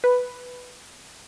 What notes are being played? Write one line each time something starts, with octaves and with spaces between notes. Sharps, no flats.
B4